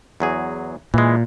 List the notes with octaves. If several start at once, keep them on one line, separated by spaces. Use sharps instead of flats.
E2 F#3 G#4
A#2 E3 G#3